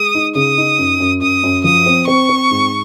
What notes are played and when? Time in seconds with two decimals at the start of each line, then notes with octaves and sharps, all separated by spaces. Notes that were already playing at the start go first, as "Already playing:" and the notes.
Already playing: G#3 D#6
0.15 D#4
0.35 C#3 D#6
0.58 D#4
0.79 F#2
1.00 F#2
1.21 F#2 D#6
1.44 F#2
1.64 F3 D#6
1.86 C4
2.08 C4 C#6
2.29 C4
2.51 G#2